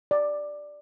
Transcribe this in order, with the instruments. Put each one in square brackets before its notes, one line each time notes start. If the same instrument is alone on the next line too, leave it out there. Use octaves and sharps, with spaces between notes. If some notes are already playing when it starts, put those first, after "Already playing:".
[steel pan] D5